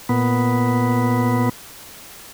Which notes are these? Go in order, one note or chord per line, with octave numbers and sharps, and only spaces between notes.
A#2 B3